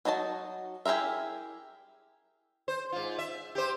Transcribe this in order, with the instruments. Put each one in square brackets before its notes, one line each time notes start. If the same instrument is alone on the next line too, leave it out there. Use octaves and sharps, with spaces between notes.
[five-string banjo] F#3 D#4 F#4 D#5 A5
E4 G4 G#4 A#4 E5
[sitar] C5
G#2 F4
E5
G4 C5